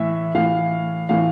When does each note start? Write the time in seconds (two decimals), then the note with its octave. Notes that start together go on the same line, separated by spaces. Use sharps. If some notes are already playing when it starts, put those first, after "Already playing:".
Already playing: A2 E3 E5
0.35 A2 E3 F5
1.09 A2 E3 F5